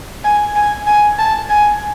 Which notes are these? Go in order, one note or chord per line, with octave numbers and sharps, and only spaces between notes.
G#5
G#5
G#5
A5
G#5